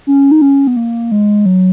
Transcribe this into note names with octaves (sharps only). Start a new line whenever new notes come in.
C#4
D#4
C#4
B3
A#3
G#3
F#3